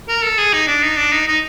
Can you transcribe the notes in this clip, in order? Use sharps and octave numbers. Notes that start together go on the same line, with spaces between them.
A#4
A4
G#4
D#4
D4
D#4
D4
D#4
D#4